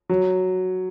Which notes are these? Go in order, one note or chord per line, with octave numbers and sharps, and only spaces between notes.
F#3